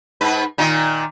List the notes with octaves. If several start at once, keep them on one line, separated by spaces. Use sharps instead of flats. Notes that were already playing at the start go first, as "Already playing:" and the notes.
G#2 B4
A#2 D#3